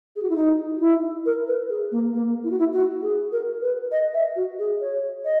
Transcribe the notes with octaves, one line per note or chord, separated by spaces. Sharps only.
G#4
F#4
E4
D#4
F#4
E4
A#4
B4
G#4
A#3
A#3
E4
F#4
E4
F#4
G#4
A#4
B4
D#5
E5
F#4
G#4
C#5
D#5